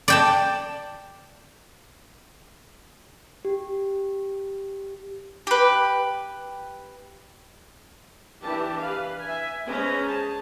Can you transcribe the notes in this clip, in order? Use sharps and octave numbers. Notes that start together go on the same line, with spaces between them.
D5 G5 A5
G4
G4 B4
E3 D4 G4 A5
B4 F5
E5 G#5
G#3 C#4 B4 C5 A#5
G#4 A5